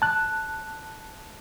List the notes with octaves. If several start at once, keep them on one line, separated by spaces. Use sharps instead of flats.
A5 F#6